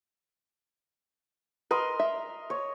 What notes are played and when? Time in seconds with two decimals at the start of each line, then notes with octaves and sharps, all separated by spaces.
1.71 A#4 B4 D#5 C6
2.00 E5
2.50 C#5